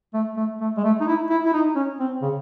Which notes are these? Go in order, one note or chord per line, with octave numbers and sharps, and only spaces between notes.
A3
A3
A3
G#3
A3
D#4
E4
E4
E4
D#4
C#4
C4
C#3